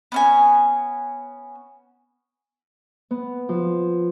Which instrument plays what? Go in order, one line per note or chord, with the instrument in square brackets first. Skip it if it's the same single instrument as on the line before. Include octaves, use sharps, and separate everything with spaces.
[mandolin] B3 C#4 G#5
[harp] B3
F3